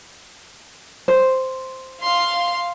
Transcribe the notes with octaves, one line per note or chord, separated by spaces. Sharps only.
C5
F5 C6